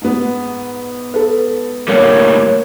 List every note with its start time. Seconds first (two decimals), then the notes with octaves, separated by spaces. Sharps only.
0.01 G#2 B3
1.14 A4 B4
1.88 A2 D3 G3 A#3 C#5 C#7